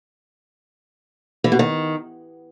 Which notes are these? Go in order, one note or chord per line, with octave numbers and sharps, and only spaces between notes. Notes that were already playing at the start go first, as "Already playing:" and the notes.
E3
B2
D#3